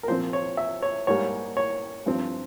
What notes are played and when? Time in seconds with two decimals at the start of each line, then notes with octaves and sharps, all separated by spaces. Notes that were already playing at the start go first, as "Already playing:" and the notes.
0.03 A#4
0.08 A#2 F3 C4 C5
0.33 C#5
0.57 E5
0.82 C#5
1.07 G#2 G3 A#3 C#5
1.57 C#5
2.06 G2 F3 C4